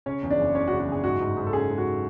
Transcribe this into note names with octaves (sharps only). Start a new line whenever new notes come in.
C#3 C#4 C#5
E2
D4 D5
F#1
C#3 C#4 C#5
F#4
C#3
F#4
F#1 G#4
G#2 F#4
G#2
G#2
A4
C#4 G#4
G#2
F#4